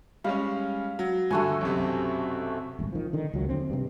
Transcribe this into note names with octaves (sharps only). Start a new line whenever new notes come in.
G3 G#3 C#4 F5
F#3
G2 D3 A3 F#4 G#5
B1 F#2 C3
D#1 G#1
D#3 F3
D3 D#3
C#2 F#3
D#2 D3 C4
G2 C3